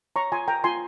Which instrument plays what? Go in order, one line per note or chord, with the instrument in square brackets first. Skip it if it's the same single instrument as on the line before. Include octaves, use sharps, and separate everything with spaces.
[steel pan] C#5 A#5 C#6
F4 G#5 C6
A#4 G5 A#5
F4 G#5 C6